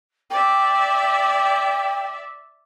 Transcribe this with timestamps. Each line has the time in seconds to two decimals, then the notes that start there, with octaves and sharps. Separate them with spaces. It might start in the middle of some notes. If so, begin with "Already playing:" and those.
0.30 D5 E5 G5